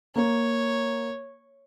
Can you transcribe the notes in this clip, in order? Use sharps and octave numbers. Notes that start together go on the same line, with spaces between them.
A#3 C#5